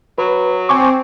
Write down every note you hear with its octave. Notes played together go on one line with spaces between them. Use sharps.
F#3 B4
C4 G#5 C#6 D6